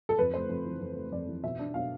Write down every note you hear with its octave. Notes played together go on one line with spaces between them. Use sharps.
A4
F2 B4
A3 C5
F2
E3
F2
A3
F2 D5
E3
B2 E5
D4
B2 F5